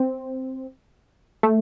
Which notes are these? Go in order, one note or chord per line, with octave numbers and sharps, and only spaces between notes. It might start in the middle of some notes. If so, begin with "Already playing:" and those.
Already playing: C4
A3